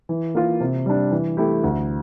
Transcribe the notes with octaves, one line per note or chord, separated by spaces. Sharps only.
E3
A#3 F4 A#4
C3
G3 D4
E3
A3 E4 G4
D2